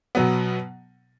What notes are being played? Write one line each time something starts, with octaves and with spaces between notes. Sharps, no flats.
B2 F#3 B3